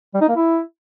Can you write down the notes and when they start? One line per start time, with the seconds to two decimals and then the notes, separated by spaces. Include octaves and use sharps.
0.14 G3
0.21 D#4
0.28 A#3
0.36 E4